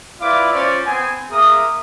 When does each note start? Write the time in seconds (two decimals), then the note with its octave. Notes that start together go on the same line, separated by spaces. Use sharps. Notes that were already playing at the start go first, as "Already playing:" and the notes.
0.20 E4 F4 B4 D5 F5 D6
0.51 C#4 F4 C5 D5
0.85 B3 C4 G#5
1.30 A#3 G#4 A#4 E5 D#6